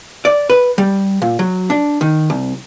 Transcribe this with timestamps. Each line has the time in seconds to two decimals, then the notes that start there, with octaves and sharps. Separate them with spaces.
0.25 D5
0.50 B4
0.78 G3
1.22 A#2
1.39 F#3
1.70 D4
2.01 D#3
2.30 C2